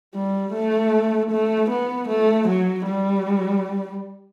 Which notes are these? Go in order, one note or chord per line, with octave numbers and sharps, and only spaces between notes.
G3
A3
A3
B3
A3
F#3
G3